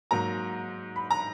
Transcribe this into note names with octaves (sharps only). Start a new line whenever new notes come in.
G#2 F#3 A#3 A#5
B5
A#5